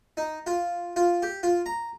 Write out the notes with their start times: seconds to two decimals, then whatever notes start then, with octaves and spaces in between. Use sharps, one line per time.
0.17 D#4
0.47 F4
0.96 F4
1.22 G4
1.43 F4
1.66 A#5